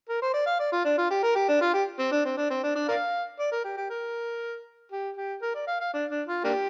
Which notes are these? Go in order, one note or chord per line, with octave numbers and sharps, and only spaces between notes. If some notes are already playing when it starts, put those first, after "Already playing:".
A#4
C5
D5
F5
D5
F4
D4
F4
G4
A#4
G4
D4
F4
G4
C4
D4
C4
D4
C4
D4
D4
A#4 D5 F5
D5
A#4
G4
G4
A#4
G4
G4
A#4
D5
F5
F5
D4
D4
F4
A#3 D4 G4